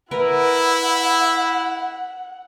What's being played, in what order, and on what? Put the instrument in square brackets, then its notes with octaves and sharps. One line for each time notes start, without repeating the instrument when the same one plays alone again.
[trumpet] E4 [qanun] A#4 B4 [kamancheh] F#5